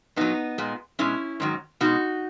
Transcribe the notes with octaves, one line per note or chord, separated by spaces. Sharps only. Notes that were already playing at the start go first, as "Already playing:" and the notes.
A#2 F#3 B3 D#4
A#2 G#3
B2 G#3 C#4 E4
G#2 D#3 F#3
B2 G#3 D#4 F#4